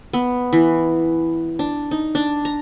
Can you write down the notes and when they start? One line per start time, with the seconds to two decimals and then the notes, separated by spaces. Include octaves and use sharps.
0.13 B3
0.53 E3
1.59 D4
1.91 D#4
2.15 D4
2.45 A#5